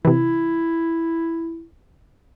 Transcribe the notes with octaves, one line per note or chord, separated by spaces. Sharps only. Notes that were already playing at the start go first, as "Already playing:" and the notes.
C3 E3 E4